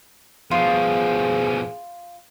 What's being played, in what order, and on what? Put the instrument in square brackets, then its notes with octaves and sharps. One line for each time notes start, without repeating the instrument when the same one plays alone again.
[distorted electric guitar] B2 F3 [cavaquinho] F4 [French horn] G#4